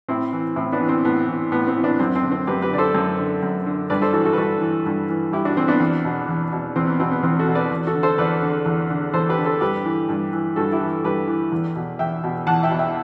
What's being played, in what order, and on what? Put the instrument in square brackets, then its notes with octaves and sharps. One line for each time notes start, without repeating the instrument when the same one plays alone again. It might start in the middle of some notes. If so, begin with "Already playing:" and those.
[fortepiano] A2 C4 E4
E3
A2 C4 E4
B3 D4
E3
C4
A2 B3
E3
A2 B3
C4
E3
B3 D4
F#2 C4
C4
D3
C4
F#2 G4 B4
G4 B4
D3 D5
A4 C5
F#2
D3
F#2
D3
G2 B4 D5
A4 C5
E3 F#4 A4
F#4 A4
B4
G2 F#4 A4
E3
G2
E3
G2 E4 G4
D4 F#4
E3 C4
B3 D4
E2
B2
E2
B2
E2 C4
B3
B2 C4
B3
E2 C4
F#4 A4
B2
B4 D5
E2
F#4 A4
D3
A4 C5
E2 B4 D5
D3
E2
D3
E2 A4 C5
G4 B4
D3
A4 C5
G2 G4 B4
E3
G2
E3
G2 F#4 A4
E4 G4
E3
G2 G4 B4
E3
E2
B2
E2 E5 G5
B2
E2 F#5 A5
E5 G5
B2
E5 G5